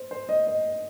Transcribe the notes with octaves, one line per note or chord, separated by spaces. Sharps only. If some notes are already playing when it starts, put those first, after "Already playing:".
Already playing: C5
C5
D#5
D#5